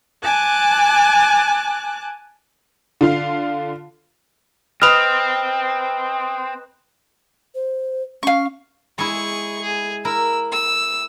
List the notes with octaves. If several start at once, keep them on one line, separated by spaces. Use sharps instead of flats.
G#5 A5 D6 F#6
D3 F4 F5
C4 B4 D#5 F6 F7
C5
C#4 F5 C#6
G#3 E4 G#4 C#6
G#4
E4 A#4 E6
E6